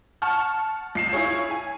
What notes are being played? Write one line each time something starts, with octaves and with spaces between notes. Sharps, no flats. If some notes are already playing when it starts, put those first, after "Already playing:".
F#5 A5 C#6 F6
C#2 C7 E7
E4 F4 G#4 C#5
G#5